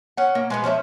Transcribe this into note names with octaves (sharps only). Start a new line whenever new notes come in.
C#4 F#5
A#3
G#3 A#3 B3
F3 C#4 D5 E5